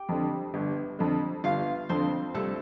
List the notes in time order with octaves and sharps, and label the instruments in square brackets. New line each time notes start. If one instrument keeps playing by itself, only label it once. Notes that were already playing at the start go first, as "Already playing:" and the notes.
Already playing: [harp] G4 G5
[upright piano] F2 D3
G1
F2 D3
[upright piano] G1 [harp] F4 F5
[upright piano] F2 D3 [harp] C4 C5
[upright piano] C2 [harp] A3 A4